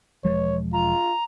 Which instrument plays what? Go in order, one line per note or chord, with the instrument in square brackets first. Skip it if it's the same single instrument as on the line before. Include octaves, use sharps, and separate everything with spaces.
[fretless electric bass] E1 F3 G#3 [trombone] C#5
[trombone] F4 [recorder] A#5